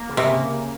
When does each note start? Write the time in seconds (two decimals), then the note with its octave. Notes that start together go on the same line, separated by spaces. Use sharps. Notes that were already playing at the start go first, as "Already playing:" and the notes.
Already playing: A#3
0.09 C#3
0.17 C3
0.24 A#3